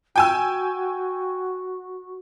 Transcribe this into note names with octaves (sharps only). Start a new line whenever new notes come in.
F#4 G5 G#5 E6